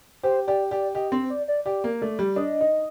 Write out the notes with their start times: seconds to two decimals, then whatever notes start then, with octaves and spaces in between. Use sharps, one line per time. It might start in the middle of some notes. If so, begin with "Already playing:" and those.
0.23 G4 C5
0.47 G4 D5
0.71 G4 D5
0.95 G4 D#5
1.12 C4 C5
1.30 D5
1.48 D5
1.65 G4 D5
1.84 A#3
2.01 A3 D5
2.19 G3
2.36 D4 D#5
2.61 D#4